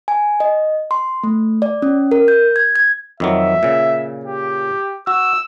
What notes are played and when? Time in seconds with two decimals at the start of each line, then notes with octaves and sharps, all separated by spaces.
0.08 G#5
0.40 D#5
0.91 C6
1.24 A3
1.62 D5
1.82 C#4
2.11 A#4
2.28 G6
2.56 G#6
2.76 G#6
3.20 F2 D#3 F#3 E5
3.63 A#2 C#3
4.25 G4
5.07 F#4 E6